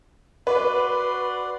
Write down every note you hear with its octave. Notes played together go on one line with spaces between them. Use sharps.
F#4 B4 D5 C6